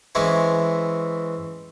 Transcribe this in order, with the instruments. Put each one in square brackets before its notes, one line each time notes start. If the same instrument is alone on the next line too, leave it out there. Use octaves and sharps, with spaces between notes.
[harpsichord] E3 G#3 C4 C#4 E4